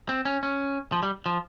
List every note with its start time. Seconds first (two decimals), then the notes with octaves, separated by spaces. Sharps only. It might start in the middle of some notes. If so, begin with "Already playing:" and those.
0.09 C4
0.25 C#4
0.43 C#4
0.92 F3
1.03 G3
1.26 F3